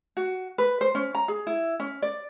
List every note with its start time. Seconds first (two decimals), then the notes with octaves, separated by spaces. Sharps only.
0.17 F#4
0.58 B4
0.81 C5
0.95 C#4
1.15 A#5
1.28 G#4
1.47 E4
1.80 C#4
2.02 D5